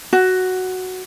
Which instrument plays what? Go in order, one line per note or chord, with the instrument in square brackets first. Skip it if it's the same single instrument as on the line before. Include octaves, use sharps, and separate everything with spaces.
[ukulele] F#4